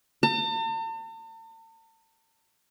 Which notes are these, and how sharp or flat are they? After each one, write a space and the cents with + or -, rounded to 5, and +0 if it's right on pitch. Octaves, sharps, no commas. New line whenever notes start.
A5 +45